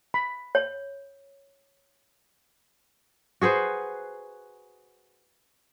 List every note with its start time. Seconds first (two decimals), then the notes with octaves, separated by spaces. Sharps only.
0.14 B5
0.55 C#5
3.41 F#4 G#4 B4 C5